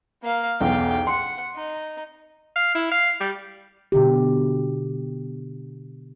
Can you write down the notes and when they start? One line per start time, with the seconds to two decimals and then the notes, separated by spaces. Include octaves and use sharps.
0.22 A#3 F5
0.61 B1 E2 F5 G5
1.07 F#5 C6
1.55 D#4
2.56 F5
2.75 E4
2.91 F5
3.21 G3
3.92 B2 D3 G4